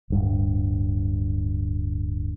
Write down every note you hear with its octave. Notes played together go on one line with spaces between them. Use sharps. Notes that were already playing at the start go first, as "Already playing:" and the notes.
D1 G2